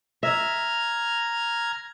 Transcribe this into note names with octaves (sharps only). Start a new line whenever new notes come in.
E5 A#5 F6 G#6